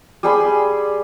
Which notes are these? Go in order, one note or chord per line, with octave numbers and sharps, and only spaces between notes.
G3 G#4 B5 C6